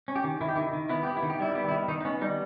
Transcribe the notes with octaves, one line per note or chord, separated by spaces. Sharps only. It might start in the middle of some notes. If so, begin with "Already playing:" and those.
C#4
G4
D#3
D#3 E4
G4
D#3 E4
D#3
B3 E4
B3 G4
E4
D#3
G4
G3 E4
B3 G4
E4
D#3
D#3 D#4
D#4
B3 C#4
G3 D#4